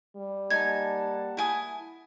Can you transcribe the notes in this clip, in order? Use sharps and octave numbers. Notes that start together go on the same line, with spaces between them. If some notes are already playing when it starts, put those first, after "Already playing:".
G3
A#3 D#4 F#5 G#5 A5 G#6
E4 G#5 D#6